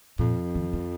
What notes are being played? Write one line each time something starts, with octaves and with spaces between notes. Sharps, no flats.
F2 A#2
D#3
F3